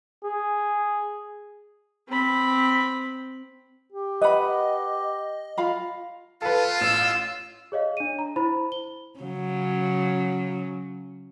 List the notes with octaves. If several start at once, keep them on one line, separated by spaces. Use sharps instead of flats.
G#4
C4 B5
G4
B4 D#5 F#5 B5
F4 F5 B5
F4 A4 B4 F5
A1 E6
G#4 C#5 D#5 F5
D4 D#7
A#5
E4 C5 B5
G7
C#3 F#3